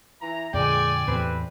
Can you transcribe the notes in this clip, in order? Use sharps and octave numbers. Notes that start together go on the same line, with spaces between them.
E3 E4 A#5
F2 A#2 D3 G#3 D5 G5 G#5
E2 A2 C4 G4 B4